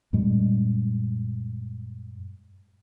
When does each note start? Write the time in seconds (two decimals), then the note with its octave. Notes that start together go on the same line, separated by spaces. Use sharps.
0.13 F#2 A#2 G3 G#3